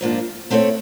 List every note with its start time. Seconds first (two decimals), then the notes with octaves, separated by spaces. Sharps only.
0.01 G#2 F3 A#3 D4
0.50 A3 C4 E4 A4 C#5